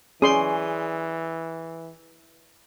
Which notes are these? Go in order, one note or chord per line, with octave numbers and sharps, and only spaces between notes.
E3 C#4 G#4 D5 C6